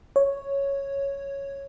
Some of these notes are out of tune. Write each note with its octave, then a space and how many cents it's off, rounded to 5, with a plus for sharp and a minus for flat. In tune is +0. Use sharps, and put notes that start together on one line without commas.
C#5 +0